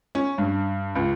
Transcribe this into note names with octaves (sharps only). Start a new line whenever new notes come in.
C#4
G2
C#2